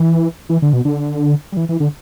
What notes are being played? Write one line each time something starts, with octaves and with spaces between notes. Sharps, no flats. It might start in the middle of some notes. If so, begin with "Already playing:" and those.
Already playing: E3
E3
D3
B2
D3
G3
E3
E3
D3